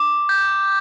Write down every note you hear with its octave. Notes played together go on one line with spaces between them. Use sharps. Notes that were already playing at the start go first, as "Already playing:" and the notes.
Already playing: D6
G6